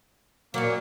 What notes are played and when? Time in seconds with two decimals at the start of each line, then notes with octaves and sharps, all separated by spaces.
0.54 A#2 F#3 A#3 C#4 D4